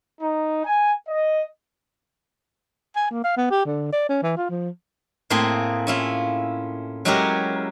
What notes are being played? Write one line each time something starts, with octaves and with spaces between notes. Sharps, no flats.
D#4
G#5
D#5
G#5
A#3
F5
B3
G4
D3
D5
C#4
E3
F4
F3
A2 A#3 C4 G#4 C6
C#4 E4 F4
F#3 G#3 C#4 E4 G4 A#4